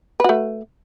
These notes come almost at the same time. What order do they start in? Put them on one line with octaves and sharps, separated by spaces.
B4 F#4 A3